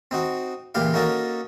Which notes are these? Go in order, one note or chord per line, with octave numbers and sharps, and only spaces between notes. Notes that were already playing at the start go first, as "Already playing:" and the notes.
C4 D#4 F#4
C#2 A#2 E3 G4 F5
A#3 C#4 D#4 F#4 A4 A#4